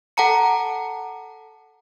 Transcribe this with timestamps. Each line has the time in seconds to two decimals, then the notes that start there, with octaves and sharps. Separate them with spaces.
0.17 A4 F#5 A5 A#5 C#7